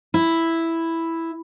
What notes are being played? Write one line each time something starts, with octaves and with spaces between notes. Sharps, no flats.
E4